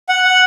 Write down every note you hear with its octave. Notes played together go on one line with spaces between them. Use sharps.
F#5
F#5